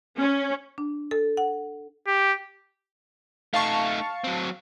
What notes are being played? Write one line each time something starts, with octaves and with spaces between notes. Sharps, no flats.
C#4
D4
A4
F#5
G4
A3 D#4 F5 A5 C#6
F#3 C4